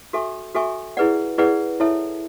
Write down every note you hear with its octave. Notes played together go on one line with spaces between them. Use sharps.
F#4 A4 E5 G#5 C#6
F#4 A4 E5 G#5 C#6
E4 G#4 B4 D5 F#5
E4 G#4 B4 D5 F#5
E4 A4 C#5 E5 A5